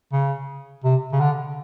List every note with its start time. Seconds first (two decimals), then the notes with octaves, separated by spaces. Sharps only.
0.12 C#3
0.84 C3
1.13 C#3
1.20 D3